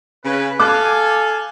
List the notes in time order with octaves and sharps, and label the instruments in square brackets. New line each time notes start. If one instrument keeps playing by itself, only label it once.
[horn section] C#3 B4
[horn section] A4 F5 G#5 [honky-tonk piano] D6 F#6